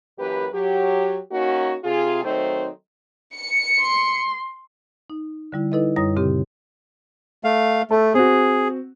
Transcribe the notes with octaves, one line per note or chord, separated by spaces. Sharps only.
F#2 E3 A#3 G4 B4
F#3 G4
A#3 C#4 D#4 F#4
C3 F4 G#4
D#3 F#3 A3 C4 D#4 C5
C#7
C6
D#4
D3 G3 E4
D#4 E4 A4 B4 D#5
F#2 G3 E4 C#5 D#6 A#6
A#2 C#3 C4 G4
A3 F5
A3 A4
C4 F#4 G#4